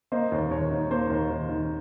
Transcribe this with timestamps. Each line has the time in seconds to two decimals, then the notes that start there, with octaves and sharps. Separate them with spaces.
0.12 A#3 C5 D#5
0.32 D#2
0.51 D#2 C#5
0.71 D#3
0.91 A#3 C5
1.10 D#2
1.30 D#2
1.49 D#3